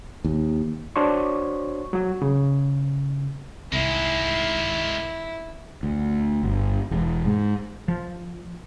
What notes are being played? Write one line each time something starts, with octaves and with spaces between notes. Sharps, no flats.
D#2
D4 F#4 C5 C#5 C#6
F#3 F#4
C#3
C2 D#3 G#3 E4
D2
G1
E1
G#2
F3